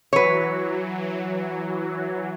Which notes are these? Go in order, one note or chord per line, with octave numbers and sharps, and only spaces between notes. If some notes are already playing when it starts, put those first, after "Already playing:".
E3 F#3 B4 C#5